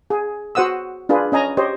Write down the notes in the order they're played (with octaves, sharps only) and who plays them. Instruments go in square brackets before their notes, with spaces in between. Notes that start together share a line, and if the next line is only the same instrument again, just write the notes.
[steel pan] G#4
F#4 C5 F#5 D#6 E6
D4 F4 G#4 B4
C#4 D#5 G#5 A#5
G4 C5 C#5 D#5